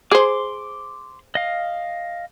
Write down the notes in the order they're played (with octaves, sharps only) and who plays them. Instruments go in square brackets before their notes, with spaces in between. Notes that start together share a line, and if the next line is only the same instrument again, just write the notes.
[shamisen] G#4 C5 [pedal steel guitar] C6 D6
[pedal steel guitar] D#5 F5